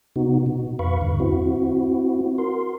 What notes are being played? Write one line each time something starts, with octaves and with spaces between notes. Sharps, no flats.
C3 B3 D#4 F#4
B2
F2 B4 F5 B5 C#6
E2 G2 D3
C4 E4 F#4
F#4 A#4 C6